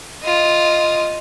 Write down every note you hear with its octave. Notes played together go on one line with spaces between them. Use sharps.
F4 D#5